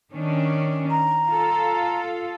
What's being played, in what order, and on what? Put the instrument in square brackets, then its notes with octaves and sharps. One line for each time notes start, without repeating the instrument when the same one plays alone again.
[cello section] D#3 C#4 D4
[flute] A#5
[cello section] F4 A4